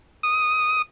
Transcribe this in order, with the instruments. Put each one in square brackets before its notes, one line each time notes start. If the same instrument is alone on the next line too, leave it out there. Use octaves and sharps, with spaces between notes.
[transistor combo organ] D#6